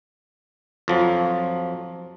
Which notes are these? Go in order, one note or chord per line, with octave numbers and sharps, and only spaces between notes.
F2 F3 F#3